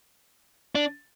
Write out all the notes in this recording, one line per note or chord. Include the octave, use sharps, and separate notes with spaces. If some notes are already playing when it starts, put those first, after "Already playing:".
D4